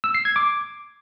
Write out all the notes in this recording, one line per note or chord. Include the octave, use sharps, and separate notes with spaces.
E6
C7
G#6
D6